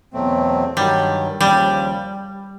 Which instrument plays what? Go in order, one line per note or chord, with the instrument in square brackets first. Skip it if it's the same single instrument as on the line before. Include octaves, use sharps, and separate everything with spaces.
[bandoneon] E2 B2 F#3 A3 C4
[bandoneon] G2 D#3 F#3 [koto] G3
[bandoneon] D#2 C#3 F3 [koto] G3